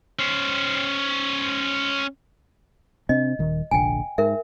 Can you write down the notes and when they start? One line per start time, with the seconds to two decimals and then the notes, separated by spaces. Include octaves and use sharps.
0.19 C#4 C5
3.09 C3 C4 D4 D#5
3.39 D#1 D#3
3.71 F1 A#1 D3 G5 G#5
4.18 G#2 A#4 E5